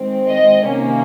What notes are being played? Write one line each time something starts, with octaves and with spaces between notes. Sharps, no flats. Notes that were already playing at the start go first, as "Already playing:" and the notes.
Already playing: D#3 G#3 C4
D#5
C3 D#3 A#3 C#4